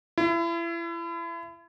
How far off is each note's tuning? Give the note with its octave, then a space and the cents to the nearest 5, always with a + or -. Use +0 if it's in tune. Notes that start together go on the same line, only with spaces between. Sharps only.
E4 +35